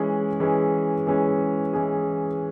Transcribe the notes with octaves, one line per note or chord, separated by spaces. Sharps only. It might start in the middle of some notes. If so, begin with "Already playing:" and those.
Already playing: E3 G#3 C#4 G#4
E3 G#3 C#4 G#4
E3 G#3 C#4 G#4
E3 G#3 C#4 G#4